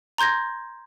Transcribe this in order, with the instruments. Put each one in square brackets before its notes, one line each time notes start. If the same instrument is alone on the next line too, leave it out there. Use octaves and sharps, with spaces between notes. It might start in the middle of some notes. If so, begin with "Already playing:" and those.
[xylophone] A#5 C6 G6 G#6 A#6